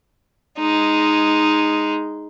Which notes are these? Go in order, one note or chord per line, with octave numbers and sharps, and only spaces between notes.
G#3 D#4